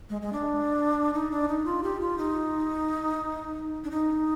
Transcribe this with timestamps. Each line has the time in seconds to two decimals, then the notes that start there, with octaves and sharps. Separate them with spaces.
0.10 G#3
0.22 G#3
0.33 D4
1.14 D#4
1.31 D4
1.48 D#4
1.65 F4
1.83 G4
2.00 F4
2.18 D#4
3.84 D4
3.91 D#4